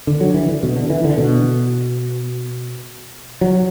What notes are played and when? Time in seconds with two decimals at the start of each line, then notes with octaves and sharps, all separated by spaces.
0.07 D3
0.21 F#3
0.34 E3
0.49 D3
0.63 B2
0.76 D3
0.90 E3
1.04 D3
1.18 B2
3.41 F#3